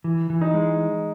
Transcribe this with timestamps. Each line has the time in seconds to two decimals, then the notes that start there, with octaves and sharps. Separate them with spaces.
0.04 E3
0.30 E3
0.41 D#4
0.54 G#3